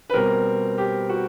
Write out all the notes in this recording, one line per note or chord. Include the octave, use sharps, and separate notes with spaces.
B4
B2 G3 C4 A#4
G4
F#4